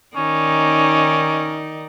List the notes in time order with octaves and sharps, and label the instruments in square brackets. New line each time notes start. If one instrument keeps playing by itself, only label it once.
[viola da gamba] D#3 D#4 D5 [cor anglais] C#4